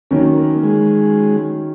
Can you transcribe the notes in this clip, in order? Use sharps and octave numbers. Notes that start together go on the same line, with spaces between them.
D#3 F#3 A#3 C#4
A#3
G#3